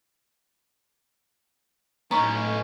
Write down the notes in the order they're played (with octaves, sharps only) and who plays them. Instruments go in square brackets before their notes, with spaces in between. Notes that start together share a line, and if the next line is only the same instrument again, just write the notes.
[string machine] A2 [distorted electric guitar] B3 D#4 [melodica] C#4 [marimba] A#5 C#6